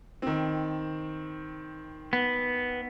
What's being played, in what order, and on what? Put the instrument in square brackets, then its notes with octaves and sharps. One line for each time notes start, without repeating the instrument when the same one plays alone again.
[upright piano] D#3 C4
[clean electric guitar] B3